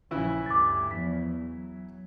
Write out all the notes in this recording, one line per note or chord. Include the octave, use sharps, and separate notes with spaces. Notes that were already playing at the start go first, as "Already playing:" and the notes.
A#1 C#3 E3 E4
D2 G2 D6 A6
E2 F3 B6
F#3